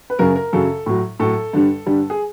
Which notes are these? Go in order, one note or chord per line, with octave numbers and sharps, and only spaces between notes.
B4
F#2 C#3 F#3 A#4
A#4
F#2 C#3 F#3 A4
A2 F#3
A2 F#3 A4
G2 D3 G3
G2 D3 G3
G#4